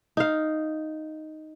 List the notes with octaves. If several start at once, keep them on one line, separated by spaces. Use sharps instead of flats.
D#4 F5